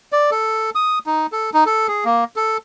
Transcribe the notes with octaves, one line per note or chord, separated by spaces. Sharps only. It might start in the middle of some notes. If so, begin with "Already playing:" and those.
D5
A4
D#6
D#4
A4
D#4
A4
G#4
A#3
A4